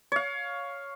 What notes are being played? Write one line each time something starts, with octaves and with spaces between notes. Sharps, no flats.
C#5 F5